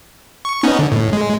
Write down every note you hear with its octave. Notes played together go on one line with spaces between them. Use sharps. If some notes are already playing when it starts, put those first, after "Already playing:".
C#6
B3 C#4 D#4
D3
A2
G#3